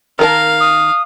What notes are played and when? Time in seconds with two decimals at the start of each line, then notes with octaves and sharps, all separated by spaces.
0.19 D#3 A#4 F5 A5
0.60 D#6